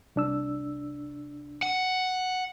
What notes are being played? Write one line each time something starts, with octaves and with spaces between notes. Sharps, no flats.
C2 D4 E6
F#5